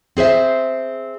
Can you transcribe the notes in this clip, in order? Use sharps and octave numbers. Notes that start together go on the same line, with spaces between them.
C4 G#4 C5 E5